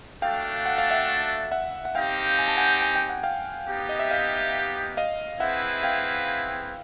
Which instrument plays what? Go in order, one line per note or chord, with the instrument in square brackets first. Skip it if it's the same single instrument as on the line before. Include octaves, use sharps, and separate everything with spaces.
[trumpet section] A3 D4 F#4 A4 [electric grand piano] F5 G5
[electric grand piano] F#5
F5
E5 F#5
E5 F#5
F#5
[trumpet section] C4 D#4 G4 [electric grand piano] F5 G5
[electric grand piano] G#5
A5
F#5 G#5
G#5
G5
F#5
F5 G5
[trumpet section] B3 D#4 G4
[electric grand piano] D#5
E5
D#5 F5
D#5 F5
[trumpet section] C4 E4 G#4 B4 [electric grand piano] E5 F#5
[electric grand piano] F5 G5